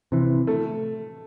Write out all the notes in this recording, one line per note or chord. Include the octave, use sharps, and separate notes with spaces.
C3 E3
A3